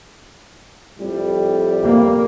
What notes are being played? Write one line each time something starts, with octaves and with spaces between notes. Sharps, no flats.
F2 A2 G3
A#3